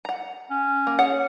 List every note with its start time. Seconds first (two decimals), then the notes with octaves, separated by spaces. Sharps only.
0.05 F#5 A#5
0.50 C#4
0.87 A#3
0.99 G#4 C#5 F#5